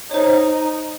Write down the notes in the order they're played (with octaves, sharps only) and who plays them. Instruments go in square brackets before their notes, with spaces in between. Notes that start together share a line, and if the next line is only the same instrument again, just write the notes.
[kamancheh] D#4 [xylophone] C5 C#5